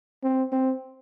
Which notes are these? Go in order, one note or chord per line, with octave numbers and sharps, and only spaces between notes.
C4
C4